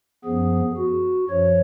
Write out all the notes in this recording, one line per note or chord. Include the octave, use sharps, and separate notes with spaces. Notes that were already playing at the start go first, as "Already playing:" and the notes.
F#2 F3 B3 G#4
F#4
F#2 F3 C#5